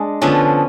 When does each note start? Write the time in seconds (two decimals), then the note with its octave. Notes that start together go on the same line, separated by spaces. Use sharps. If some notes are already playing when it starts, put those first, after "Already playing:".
Already playing: G#3 D4
0.22 D3 F3 B3 C#4